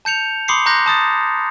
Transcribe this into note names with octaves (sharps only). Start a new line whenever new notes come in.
A5 G6 C#7 F7
B5 C6 D6 D#6 C7 C#7
A#5 C6 D6 F#6 G6 A#6
A5 D#6 A6